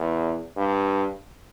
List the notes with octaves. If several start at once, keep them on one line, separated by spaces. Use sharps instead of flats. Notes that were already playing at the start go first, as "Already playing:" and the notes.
Already playing: E2
G2